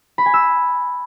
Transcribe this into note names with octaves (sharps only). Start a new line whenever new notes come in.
B5
G#5
E6